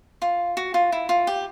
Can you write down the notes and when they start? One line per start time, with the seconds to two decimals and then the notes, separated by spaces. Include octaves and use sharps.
0.22 F4
0.57 F#4
0.74 F4
0.92 E4
1.09 F4
1.27 G4